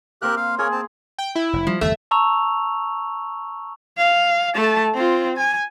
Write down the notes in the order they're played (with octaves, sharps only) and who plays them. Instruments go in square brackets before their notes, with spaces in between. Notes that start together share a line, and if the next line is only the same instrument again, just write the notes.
[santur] A#3 C4 C5 [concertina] G4 A#4 F#6
[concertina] F5
[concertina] A#3 A#4 C#5 [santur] G#4
[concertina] C4 A5
[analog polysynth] G5
E4
[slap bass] F1
[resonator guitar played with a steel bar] F3 [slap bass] G3
[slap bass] G1 E2 C3 [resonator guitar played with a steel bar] A3 [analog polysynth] E5
[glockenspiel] A5 A#5 C#6 E6 F7
[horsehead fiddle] F5
A3 A5
C4 F4
G#5